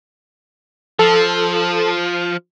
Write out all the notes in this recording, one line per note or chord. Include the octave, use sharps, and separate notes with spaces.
F3 A4